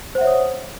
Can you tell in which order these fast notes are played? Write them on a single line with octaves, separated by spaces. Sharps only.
C5 F#5 E5 C#5 D#6